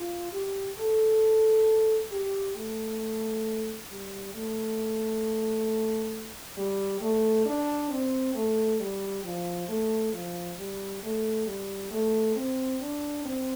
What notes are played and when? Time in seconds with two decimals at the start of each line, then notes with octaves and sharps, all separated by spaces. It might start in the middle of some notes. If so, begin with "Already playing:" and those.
Already playing: F4
0.33 G4
0.78 A4
2.11 G4
2.56 A3
3.90 G3
4.34 A3
6.57 G3
7.01 A3
7.46 D4
7.90 C4
8.35 A3
8.80 G3
9.24 F3
9.68 A3
10.13 F3
10.58 G3
11.03 A3
11.47 G3
11.91 A3
12.36 C4
12.81 D4
13.25 C4